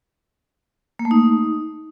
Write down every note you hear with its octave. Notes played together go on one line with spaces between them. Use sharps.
A#3
A3
D#4